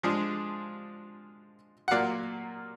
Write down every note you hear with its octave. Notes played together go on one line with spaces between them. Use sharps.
F3 G#3 D4 F4 G#4
F#5
A#2 F#3 A#3 D5 F5